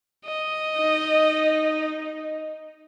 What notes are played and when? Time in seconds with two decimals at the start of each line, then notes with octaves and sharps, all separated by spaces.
0.25 D#5
0.79 D#4